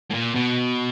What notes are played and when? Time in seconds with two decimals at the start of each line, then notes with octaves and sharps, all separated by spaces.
0.11 A2
0.14 A#2
0.36 B2